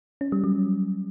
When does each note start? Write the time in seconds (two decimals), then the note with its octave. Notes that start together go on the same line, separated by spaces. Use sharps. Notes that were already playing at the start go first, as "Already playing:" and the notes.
0.21 C#4
0.32 G3
0.44 F#3